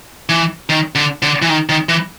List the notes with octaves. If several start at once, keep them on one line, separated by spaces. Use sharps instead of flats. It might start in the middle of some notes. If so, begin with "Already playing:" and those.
E3
D#3
D3
D3
E3
D#3
D#3
E3